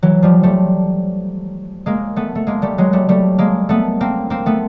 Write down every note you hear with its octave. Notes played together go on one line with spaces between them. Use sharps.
E3 F#3
F3 G3
G3 A3
G#3 A#3
A3 B3
A3
G#3 A#3
G3 A3
F#3 G#3
G3 A3
G3 A3
G#3 A#3
A3 B3
A#3 C4
A#3 C4
A3 B3